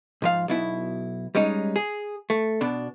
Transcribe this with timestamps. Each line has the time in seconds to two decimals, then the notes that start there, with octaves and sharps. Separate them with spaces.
0.22 G#2 F3 F5
0.48 B1 B2 E4
1.35 G3 G#3 C#4 D#4
1.76 G#4
2.30 A3
2.61 B2 D4